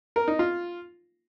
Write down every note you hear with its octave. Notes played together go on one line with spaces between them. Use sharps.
A#4
D#4
F4